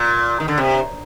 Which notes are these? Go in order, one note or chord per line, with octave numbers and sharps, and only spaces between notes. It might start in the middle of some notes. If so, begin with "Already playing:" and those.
Already playing: A#2
D#3
D3
C3